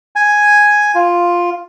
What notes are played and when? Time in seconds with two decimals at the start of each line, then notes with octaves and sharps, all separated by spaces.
0.16 G#5
0.95 F4